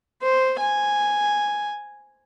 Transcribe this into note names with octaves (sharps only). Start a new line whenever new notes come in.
C5
G#5